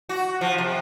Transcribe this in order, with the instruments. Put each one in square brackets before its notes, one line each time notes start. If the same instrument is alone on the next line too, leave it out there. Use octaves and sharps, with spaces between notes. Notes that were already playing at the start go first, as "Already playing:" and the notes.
[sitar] F#4
F3
C3